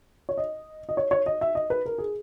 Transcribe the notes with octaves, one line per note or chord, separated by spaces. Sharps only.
C#5
D#5
D#5
C#5
C#5
D#5
E5
D#5
B4
A#4
G#4